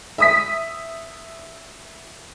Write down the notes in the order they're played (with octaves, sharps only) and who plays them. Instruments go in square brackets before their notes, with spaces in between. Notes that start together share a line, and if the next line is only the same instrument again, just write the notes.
[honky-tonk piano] E5 D#6 B6